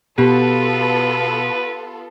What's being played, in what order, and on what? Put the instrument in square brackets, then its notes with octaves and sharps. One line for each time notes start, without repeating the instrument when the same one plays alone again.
[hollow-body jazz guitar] B2 [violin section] B3 F4 A4 [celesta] G4 [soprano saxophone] B4